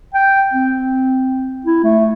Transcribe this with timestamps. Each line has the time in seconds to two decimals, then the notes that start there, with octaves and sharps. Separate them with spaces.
0.14 G5
0.54 C4
1.65 E4
1.84 A3